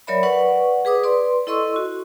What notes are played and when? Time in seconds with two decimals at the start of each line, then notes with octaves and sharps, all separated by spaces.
0.07 F#3 A#4 C#5 D5 E5 B5
0.23 B4 D5 F#5 C#6
0.85 G#4 B4 D6 D#6
1.03 B4 D5 C6
1.47 E4 A4 D#5 C6 C#6 E6
1.76 F#4